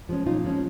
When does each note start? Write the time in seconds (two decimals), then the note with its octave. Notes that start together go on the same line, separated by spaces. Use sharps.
0.09 F3 G#3 C#4
0.26 A#2 D#4 F4
0.45 F3 G#3 C#4